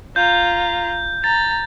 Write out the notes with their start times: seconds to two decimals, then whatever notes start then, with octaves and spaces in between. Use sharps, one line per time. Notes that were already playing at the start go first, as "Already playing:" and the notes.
0.16 F4 A#5 G6
1.24 A#5 A6